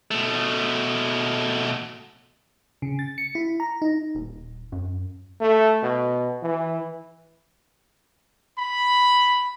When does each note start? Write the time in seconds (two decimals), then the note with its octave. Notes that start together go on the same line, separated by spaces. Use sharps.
0.11 B2 A3
2.82 C#3
2.99 A6
3.18 C#7
3.35 E4
3.60 A#5
3.82 D#4
4.15 D#1
4.72 F#2
5.41 A3
5.83 B2
6.42 E3
8.58 B5